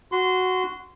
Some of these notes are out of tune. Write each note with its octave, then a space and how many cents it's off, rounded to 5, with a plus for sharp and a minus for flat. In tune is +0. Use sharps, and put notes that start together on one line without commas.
F#4 +0 C6 -20